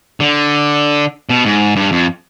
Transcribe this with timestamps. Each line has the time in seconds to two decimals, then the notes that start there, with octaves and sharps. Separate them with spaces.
0.20 D3
1.30 B2
1.45 G#2
1.76 G2
1.92 F2